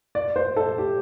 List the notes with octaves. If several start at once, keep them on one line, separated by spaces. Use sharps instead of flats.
D5
C5
A4
G4